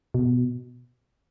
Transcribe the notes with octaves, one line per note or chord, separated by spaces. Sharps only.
B2